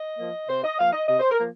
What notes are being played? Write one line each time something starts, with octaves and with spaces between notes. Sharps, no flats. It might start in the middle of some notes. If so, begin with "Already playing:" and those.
Already playing: D#5
F3 A#3
C3 C5
D#5
F3 A#3 F5
D#5
C3 D#5
C5
A#4
F3 A#3